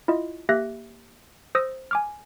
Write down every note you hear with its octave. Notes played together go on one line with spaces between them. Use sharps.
E4 F4 D#5
A#3 G4 E5 F#6 A#6
C5 D#6 E6 A#6
G#5 D6 F6